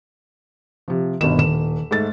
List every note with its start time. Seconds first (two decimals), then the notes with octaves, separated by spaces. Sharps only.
0.88 C3 F3
1.21 G1 B2 D#3 E7
1.38 D#1 E7
1.91 G#2 A3 A6